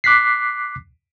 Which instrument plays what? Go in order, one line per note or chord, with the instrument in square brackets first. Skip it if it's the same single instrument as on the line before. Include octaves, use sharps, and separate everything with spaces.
[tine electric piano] D6 F#6 B6 C7